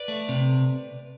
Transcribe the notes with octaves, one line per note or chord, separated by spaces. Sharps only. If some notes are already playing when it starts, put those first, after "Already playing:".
Already playing: B4 D5
A3
C3